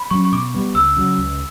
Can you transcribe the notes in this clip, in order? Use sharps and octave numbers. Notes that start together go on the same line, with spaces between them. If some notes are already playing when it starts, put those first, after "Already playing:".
Already playing: B5
F#3 C#4 C#6
C#6
B2 D6
G3 B3
C#2 E6
C#3 F#3
C#2